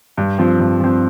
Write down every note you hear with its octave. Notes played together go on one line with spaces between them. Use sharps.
G2
F3 C4
G2
F3 C4